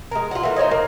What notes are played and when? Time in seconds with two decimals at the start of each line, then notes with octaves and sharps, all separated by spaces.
0.11 G#3 A#4
0.31 F4 F#5
0.43 E3 A#3 A4
0.56 D#4 C5 C#5 D#5
0.71 A#3